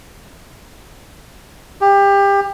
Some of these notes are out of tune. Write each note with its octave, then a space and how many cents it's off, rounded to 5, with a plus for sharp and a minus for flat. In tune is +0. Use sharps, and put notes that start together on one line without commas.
G4 +25